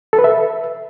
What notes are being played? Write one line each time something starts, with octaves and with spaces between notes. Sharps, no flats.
A4
B4
E5